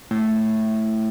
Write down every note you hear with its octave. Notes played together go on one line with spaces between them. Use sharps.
A2